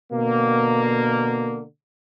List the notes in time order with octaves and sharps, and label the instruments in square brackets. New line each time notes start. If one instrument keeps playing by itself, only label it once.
[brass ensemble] B2 D3 A#3